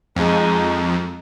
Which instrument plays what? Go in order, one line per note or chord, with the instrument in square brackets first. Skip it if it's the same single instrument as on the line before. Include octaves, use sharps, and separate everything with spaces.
[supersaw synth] F2 [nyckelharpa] G#3 D#4